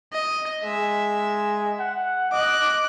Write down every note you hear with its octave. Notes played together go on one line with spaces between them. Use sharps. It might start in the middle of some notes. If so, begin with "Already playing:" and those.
D#5
G#3 E5
F#5
D#5 D6 F#6